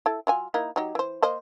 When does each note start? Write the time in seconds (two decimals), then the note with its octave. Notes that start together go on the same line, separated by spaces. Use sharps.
0.06 E4 A4
0.27 F#3 F4 G#5
0.54 A#3 D#4 E4
0.76 F#3 D#4 G4
0.95 E3 C5
1.23 A#3 C5 D#5